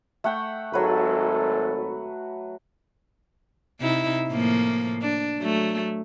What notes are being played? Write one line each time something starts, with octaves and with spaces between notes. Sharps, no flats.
A3 F#5 G5
G#1 F#3 A4 B4
C3 D#4 E4
A2 F3 A#3
D4
F#3 A3